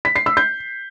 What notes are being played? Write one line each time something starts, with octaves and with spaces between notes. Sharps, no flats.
B6
C7
E6
G6